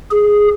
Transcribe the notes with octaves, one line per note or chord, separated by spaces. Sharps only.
G#4